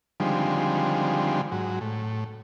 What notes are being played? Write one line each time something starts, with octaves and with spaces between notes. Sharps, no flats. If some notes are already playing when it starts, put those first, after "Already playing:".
D3 D#3 F3 G3 G#3 C4
G#2 F#3
A2